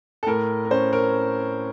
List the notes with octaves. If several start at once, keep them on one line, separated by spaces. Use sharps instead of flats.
A4
A2 A#4
A#4
C#4 C5
A#4